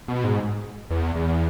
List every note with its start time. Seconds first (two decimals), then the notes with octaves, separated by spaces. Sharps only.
0.08 B2
0.24 G#2
0.90 E2
1.16 E2